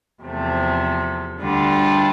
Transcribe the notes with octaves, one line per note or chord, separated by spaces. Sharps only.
E2 C3 F3 A3
D2 D3 G3 D4 F4